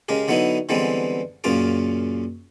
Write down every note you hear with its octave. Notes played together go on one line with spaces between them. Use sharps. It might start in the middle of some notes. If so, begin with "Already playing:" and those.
C#3 G#3 G4 A#4
D3 F#3 B3 D#4 E4
D3 E3 G3 G#3 B3 C4
F#2 A#2 C#3 F4 D6